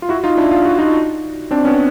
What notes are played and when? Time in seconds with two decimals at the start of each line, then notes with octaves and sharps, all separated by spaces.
0.02 F4
0.09 E4 F#4
0.24 D#4 F4
0.38 D4 E4
0.51 F4
0.65 F#4
0.79 D#4 F4
1.51 C4 D4
1.65 B3 C#4